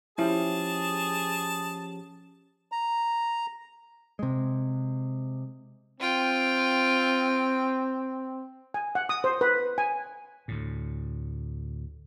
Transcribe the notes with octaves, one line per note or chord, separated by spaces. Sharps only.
F3 C#4 E4 G4 G#4 A5
A#5
C3 G#3
C4 F4 G5
G#5
F#5
D#6
C5
B4
G#5
D2 A2